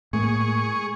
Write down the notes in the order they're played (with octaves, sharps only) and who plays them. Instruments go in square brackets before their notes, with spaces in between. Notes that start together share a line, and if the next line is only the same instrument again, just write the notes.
[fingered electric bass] A2 G#3 A#3 [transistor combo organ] G#4 C#6